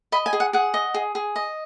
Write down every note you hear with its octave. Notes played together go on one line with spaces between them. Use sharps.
D#5 B5
G#5
G#4
F#5
G#4 F#5
D#5
G#4
G#4
D#5